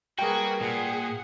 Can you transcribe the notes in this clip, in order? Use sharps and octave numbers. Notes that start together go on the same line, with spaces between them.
G3 A#3 F#4 G#4 A#4 B4 G5
A#2 G#4 F#5